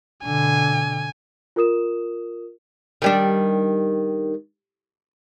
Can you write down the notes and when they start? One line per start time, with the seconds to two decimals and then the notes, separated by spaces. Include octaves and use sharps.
0.25 B2 D3 G#5
1.56 F4 A#4 D#6 E7
3.02 D#3 G3 D4